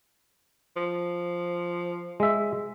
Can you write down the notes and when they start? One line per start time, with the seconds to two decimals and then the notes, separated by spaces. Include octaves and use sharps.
0.76 F3
2.20 G#3 E5